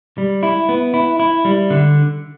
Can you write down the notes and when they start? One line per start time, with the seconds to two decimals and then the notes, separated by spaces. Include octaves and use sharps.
0.18 G3
0.43 E4
0.69 B3
0.94 E4
1.20 E4
1.45 G3
1.70 D3